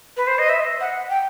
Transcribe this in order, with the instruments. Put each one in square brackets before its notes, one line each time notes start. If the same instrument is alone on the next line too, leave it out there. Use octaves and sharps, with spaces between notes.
[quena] B4
C5
D#5
E5
F#5
G5